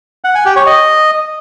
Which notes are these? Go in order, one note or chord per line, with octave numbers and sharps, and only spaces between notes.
F#5
G#5
G4
C#5
D#5